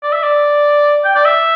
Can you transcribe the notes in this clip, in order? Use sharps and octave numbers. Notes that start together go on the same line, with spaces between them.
D5
E5
D5
G5
D5
E5